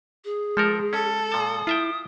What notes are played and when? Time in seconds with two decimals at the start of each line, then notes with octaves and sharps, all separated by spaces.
0.25 G#4
0.57 F3 G#3 A4 A#4
0.93 C#4 A4
1.32 A#2 A5 D#6
1.67 E4 F4 E5 G5